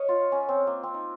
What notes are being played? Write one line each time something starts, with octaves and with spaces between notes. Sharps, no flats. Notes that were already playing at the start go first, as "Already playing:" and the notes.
Already playing: C#5 D#5 F5
F4
C#4
C4
A#3
C4
D#4